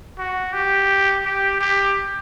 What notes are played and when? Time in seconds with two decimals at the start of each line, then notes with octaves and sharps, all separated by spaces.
0.18 F#4
0.53 G4
1.25 G4
1.61 G4